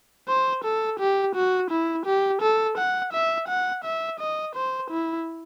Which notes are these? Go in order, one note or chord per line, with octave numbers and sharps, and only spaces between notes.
C5
A4
G4
F#4
E4
G4
A4
F#5
E5
F#5
E5
D#5
C5
E4